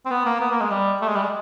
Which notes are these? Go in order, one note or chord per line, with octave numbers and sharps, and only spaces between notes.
C4
B3
A#3
B3
A#3
G#3
G3
A3
G#3
G3
G#3